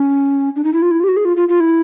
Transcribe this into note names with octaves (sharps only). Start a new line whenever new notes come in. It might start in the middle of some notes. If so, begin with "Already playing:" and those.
Already playing: C#4
D4
D#4
E4
F4
E4
F4
G4
F#4
G#4
F4
F4
F4
E4